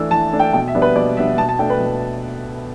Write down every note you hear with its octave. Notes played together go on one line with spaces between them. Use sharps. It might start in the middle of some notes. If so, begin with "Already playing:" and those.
Already playing: E3 A3 D4 E6
E3 A5
A3 D4
G5
B2 G5
E5
G3 B3 D4
B4
B2 D5
G3 B3 D4 E5
B2 A5
A5
A3 D4 G5
B4
B2